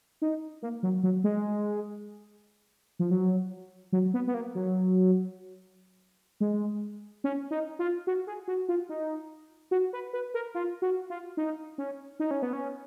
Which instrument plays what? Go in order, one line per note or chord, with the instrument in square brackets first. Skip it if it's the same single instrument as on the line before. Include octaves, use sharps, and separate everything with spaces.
[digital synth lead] D#4
A#3
F#3
F#3
G#3
F3
F#3
F#3
B3
B3
A#3
F#3
G#3
C#4
D#4
F4
F#4
G#4
F#4
F4
D#4
F#4
B4
B4
A#4
F4
F#4
F4
D#4
C#4
D#4
C#4
B3
C#4